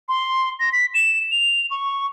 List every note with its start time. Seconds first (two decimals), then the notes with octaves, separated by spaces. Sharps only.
0.09 C6
0.60 A#6
0.73 B6
0.94 E7
1.31 F7
1.71 C#6